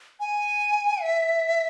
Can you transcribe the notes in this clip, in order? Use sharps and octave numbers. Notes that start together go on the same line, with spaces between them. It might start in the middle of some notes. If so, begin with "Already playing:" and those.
G#5
E5